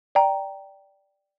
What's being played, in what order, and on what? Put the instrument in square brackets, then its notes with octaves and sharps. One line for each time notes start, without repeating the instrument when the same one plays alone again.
[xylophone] D5 G5 A#5